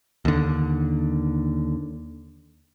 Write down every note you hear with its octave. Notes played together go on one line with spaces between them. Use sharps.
D#2 D3